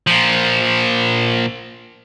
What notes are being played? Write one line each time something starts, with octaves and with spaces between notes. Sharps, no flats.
A#2 F3